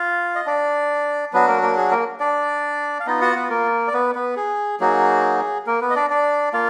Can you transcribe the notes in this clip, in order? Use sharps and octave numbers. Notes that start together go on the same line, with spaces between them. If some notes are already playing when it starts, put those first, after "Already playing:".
Already playing: F4 F5
D#5
D4 D5
F#3 B3 D4 F#4 B4
A#3 A#4
A#3 A#4
G#4
A#3 A#4
D4 D5
F5
B3 D#4 F4 D#5
F#4 F#5
B3 B4
A#3 A#4
D5
B3 B4
B3 B4
G#4
F#3 A#3 D#4 F#4 G#4
A#3 A#4
B3 B4
D#5
D4 D5
D4 D5
A#3 F4 F5